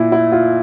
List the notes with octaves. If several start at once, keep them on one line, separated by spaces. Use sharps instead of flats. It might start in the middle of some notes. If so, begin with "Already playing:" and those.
Already playing: A#2 E4
E4
F4